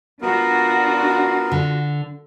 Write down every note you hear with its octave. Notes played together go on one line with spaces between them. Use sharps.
B3 D4 F4 F#4 A#4
D3